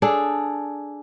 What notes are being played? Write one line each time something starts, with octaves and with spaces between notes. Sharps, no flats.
D4 G#4 A4